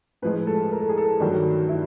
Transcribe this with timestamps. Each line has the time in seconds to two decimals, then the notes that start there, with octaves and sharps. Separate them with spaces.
0.22 A2 F3 G#3 B4
0.47 A4
0.72 A#4
0.80 A4
0.89 G#4
0.98 A4
1.20 G2 D#3 F#3 D#4
1.69 E4